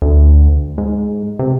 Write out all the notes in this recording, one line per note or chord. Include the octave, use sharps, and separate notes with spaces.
D2
G#2
C3